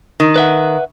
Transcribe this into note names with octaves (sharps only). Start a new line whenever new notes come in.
D#3
B4 E5 F#5